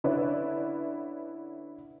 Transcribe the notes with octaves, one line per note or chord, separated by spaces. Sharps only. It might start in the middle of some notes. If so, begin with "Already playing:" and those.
D3 C#4 E4 B4 D5